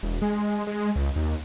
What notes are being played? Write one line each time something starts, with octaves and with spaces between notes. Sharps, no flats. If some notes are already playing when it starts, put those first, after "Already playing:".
E1
G#3
G#3
C#2
D#2